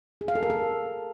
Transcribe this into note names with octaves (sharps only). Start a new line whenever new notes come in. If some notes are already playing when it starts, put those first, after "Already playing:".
G#4
F5
A4
A#4
A4